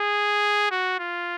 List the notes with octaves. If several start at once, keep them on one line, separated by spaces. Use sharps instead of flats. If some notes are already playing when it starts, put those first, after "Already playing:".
Already playing: G#4
F#4
F4